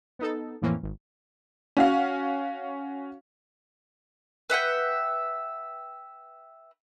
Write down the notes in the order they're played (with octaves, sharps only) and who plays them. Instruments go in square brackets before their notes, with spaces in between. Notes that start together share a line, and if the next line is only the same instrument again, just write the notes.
[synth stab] B3 D#4 A4
F2 A2 E3 A#3 C4 C#4
G#1
[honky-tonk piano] C#4 F#4 F5
[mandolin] B4 E5 F#5 G5